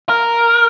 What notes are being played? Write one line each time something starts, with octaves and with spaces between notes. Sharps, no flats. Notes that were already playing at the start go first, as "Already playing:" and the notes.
A#4